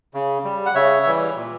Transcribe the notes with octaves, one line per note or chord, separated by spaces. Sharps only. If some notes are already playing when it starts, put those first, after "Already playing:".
C#3
G3
F#5
C#3 C#5 E5
E3 G3
A#2